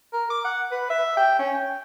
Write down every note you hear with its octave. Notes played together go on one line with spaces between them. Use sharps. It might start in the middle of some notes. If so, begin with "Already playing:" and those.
A#4
D6
F#5
B4
E5
G5
C#4
G5